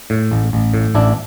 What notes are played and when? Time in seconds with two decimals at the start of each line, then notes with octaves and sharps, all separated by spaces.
0.10 A2
0.32 A1
0.53 A1
0.74 A2
0.95 A1 D4 E4